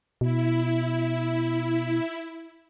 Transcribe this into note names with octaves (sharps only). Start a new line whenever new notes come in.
B2 E4